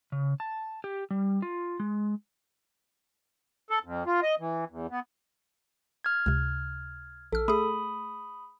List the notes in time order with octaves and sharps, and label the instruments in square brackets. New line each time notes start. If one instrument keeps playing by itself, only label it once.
[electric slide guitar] C#3
A5
G4
G3
F4
G#3
[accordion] A4
F2
F4
D#5
E3
E2
B3
[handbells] F6 G#6
[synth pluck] C#2 C3
[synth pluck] A#1 F6 [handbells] A4
[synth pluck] A3 G#4 [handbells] B5 D#6